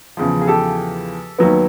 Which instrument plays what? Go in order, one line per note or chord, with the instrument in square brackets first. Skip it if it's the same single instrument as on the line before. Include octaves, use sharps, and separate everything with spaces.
[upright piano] E2 C#3 F3
G#4
G4 A4
D#2 D#3 F#3 B3